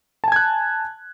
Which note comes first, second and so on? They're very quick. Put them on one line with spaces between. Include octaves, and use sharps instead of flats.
A5 G#5 G#6 F#6